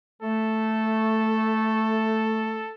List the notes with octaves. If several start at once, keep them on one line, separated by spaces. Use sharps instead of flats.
A3 A4